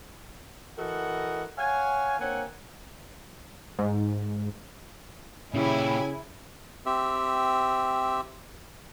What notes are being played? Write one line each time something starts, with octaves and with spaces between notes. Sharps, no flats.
E3 F#4 A4 A#4 D#5 F#5
C#5 F5 F#5 G#5
A#3 C4 D4 C#5 F#5 G#5
G#2
A#2 C#3 E4 G4 C#5 G#5
C4 G4 E5